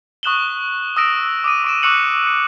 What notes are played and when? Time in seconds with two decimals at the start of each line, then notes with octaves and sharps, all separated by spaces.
0.23 C#6 D#6 F#6 E7 F#7 G7
0.97 D#6 E6 A#6 D7 E7
1.44 D6 D#6 D#7
1.64 C#6 D7 E7
1.83 C#6 D6 E6 F#6 C#7 F#7
2.27 C#7